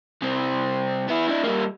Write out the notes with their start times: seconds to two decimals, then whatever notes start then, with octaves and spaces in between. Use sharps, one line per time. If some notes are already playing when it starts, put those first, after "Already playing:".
0.22 C2 C4
1.08 B3 E4
1.28 D4 E4
1.43 G3 A#3